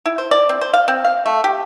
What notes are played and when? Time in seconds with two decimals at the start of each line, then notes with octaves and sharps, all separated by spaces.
0.06 E4
0.18 C5
0.31 D5
0.49 C4
0.61 C5
0.73 F5
0.88 C4
1.05 F5
1.26 A3
1.44 G4